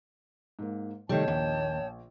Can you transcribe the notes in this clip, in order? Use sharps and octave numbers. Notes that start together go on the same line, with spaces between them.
G#2 A#3
C3 D#3 G3 A3 C#5 G5 A5
A#1 D#2